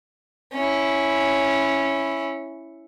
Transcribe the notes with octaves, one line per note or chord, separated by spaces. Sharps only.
C#4 E4